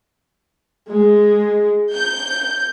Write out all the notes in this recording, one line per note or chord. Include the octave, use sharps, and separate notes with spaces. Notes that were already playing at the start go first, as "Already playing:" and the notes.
G#3
G6